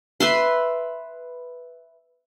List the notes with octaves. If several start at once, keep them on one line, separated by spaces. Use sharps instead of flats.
B4 E5 C6